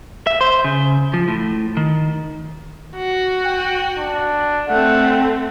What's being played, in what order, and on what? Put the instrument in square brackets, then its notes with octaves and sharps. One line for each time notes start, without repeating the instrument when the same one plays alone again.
[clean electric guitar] E5
C5
C#3
F3
A2
D#3
[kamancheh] F#4
[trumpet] G5
D4
[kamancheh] A3 C4 [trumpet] F#5